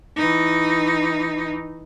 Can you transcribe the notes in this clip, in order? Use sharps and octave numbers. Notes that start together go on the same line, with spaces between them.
E3 D#4